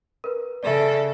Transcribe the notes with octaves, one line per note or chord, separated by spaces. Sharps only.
A#4 B4
C#3 A4 D5 E5